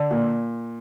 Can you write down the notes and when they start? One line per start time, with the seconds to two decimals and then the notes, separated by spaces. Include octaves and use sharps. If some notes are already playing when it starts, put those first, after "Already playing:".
Already playing: D3
0.11 A#2